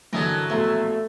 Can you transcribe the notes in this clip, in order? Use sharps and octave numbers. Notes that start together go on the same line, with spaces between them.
G2 D3 E3 F#3 A#4 D#5 A5
A#1 B2 A3 E5 A#5 C6